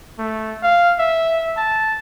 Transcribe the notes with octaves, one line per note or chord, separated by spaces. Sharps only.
A3
F5
E5
A5